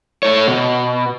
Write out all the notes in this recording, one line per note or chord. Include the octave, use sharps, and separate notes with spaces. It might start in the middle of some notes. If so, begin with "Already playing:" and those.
A3 C#5
B2